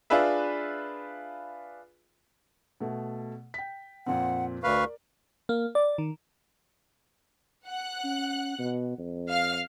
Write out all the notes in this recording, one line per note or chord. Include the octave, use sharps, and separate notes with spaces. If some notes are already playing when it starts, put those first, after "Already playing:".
D4 F4 G#4 B4 E5
B2 A3
G5 B6
F2 A#2 C4 F#5
D2 A#4 B4 D5 F5 C#6
A#3
D5
D#3
F#5 F#6
C#4
B2
F2
F5 F6